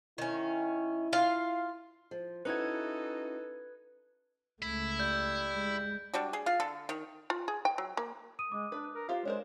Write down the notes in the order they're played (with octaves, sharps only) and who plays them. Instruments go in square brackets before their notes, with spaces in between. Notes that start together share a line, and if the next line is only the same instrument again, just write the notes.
[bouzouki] D#3 C#4 [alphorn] E4
[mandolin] F4 [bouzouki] F5
[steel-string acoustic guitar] F3
[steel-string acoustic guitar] C#4 E4 F#4 [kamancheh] D#4 A4 [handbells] B4 G#6
[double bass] C#2 A3 [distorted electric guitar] E4
[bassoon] G3 [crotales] G6
[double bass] G#3
[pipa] G3 D4 F#4
G#4
F4 F5
D3 A4
D#3
[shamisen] F4
G#4
G5
F#3
A#3
[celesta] D#6 D#7
[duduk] G#3 [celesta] D6 D#6
[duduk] D4 [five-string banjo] B4
[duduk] A#4
[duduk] F4 [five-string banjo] G4 C5 F5
[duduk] G#3 [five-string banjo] D4 A#4 C5 [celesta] C#5